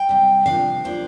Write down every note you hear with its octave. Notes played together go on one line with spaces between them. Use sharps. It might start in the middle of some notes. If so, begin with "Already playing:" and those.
Already playing: G5
C3 G3 C4
C3 F3 A#3 D4 F5
C3 F3 A#3 D4 C5